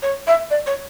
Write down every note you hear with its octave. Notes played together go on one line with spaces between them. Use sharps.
C#5
E5
D5
C#5